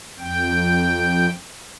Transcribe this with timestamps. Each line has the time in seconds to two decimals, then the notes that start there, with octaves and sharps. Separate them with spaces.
0.19 F2 G5